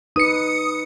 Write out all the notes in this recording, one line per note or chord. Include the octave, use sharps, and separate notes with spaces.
D#4 B4 D#6 C#7